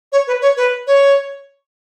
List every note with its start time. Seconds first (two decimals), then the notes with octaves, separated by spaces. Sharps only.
0.12 C#5
0.27 B4
0.42 C#5
0.57 B4
0.87 C#5